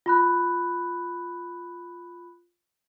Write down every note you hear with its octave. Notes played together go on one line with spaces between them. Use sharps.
F4 B5 F#6